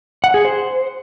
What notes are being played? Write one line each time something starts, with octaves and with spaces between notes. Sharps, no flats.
F#5
G#4
C5